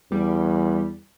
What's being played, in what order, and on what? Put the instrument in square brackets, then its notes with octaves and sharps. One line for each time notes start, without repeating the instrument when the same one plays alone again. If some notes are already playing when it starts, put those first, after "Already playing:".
[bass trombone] E2 [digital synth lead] G3